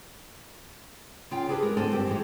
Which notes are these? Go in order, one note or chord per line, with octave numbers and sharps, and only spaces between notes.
C#3 F4 G5
D4 G4 G#4 B4
G#3 A#4
D2 A2 C4 D4 A4 G#5
G2 C4 G4
E3 F3 G#3